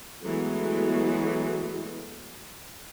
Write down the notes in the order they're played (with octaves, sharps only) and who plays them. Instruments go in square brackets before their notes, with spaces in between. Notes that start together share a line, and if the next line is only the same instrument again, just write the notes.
[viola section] E3 F#3 G#3 A3 B3 F#4